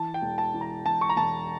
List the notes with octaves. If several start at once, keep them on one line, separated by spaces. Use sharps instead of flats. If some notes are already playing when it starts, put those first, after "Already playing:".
Already playing: E3 A5
G5
E1
A5
E3
A#5
E1 A5
C#6
A#5
E1 A5